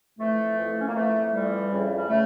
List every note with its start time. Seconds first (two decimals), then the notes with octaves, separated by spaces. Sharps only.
0.19 F2 E3 A3
0.57 F2 E3
0.81 C#4
0.88 A#3
0.95 F2 E3 A3
1.33 F2 E3 G3
1.71 F2 C#3 E3
1.98 G3
2.09 C#3 A3